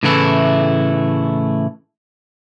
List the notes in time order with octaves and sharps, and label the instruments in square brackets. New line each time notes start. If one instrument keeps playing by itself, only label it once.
[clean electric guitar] A2 C#3 E3 A3 E4